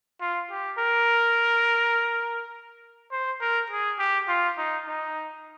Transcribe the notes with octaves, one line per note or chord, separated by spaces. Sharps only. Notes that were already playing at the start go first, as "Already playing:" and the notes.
F4
G4
A#4
C5
A#4
G#4
G4
F4
D#4
D#4